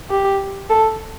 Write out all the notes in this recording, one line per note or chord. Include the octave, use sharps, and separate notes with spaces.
G4
A4